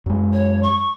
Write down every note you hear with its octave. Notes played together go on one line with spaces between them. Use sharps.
F#2 G#3
C#5
C#6